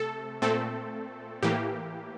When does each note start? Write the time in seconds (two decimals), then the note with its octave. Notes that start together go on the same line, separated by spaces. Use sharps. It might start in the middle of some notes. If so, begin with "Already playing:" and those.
Already playing: C3 A3 A4
0.42 A#2 A3 C4 A4
1.43 A2 E3 A#3 G4